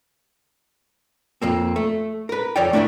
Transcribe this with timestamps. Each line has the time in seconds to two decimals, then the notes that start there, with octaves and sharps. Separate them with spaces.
1.42 F2 A#3 C4
1.76 A3
2.29 A#4 B4
2.56 F2 C#5 D5 G5
2.73 A3 D4 E4 A#4 E5